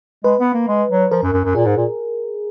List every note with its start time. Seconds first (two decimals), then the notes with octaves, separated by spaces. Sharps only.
0.24 G#3 B4
0.40 B3
0.53 A#3
0.68 G#3
0.90 F#3
1.11 F3 A#4
1.23 F#2
1.33 F#2
1.45 F#2
1.55 A#2 G#4
1.66 G#2
1.77 A#2